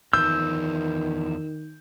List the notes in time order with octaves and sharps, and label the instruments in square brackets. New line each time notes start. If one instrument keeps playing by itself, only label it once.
[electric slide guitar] E2 F3 [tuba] D#3 [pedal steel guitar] E6 [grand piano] G6